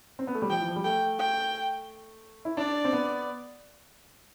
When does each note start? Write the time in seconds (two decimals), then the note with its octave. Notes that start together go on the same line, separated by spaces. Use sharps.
0.19 C4
0.27 B3
0.35 A3
0.42 G3
0.49 F3 G5
0.60 E3
0.68 F3
0.76 G3
0.84 A3 G5
1.19 G5
2.45 E4
2.57 D4 D5
2.85 C4
2.93 B3